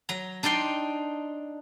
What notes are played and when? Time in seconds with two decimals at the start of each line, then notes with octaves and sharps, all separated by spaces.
0.09 F#3 A#5
0.43 D4 D#4 D5 G5 C6